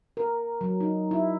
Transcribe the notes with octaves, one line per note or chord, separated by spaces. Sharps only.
A#4
F#3
D#4
E4